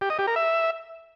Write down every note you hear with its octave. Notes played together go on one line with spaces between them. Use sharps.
G4
D#5
G4
A#4
E5